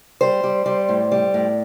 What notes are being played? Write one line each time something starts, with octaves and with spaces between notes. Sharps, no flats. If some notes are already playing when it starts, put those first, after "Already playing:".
G3 C5
G3
G3
A2
G3
A2